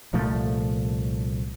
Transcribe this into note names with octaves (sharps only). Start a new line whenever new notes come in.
C2 A#2 F3 A3